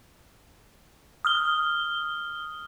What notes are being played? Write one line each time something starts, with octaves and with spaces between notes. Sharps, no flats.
D#6 F6 G7